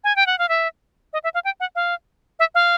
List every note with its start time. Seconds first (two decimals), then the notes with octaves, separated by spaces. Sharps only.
0.04 G#5
0.16 G5
0.27 F#5
0.39 F5
0.49 E5
1.13 D#5
1.24 E5
1.34 F5
1.45 G5
1.60 F#5
1.75 F5
2.39 E5
2.55 F5